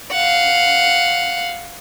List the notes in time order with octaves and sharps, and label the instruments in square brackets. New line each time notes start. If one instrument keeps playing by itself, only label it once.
[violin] F5 F#5